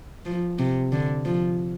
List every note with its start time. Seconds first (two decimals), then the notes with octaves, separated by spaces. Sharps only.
0.26 F3
0.59 C3
0.92 D3
1.25 F3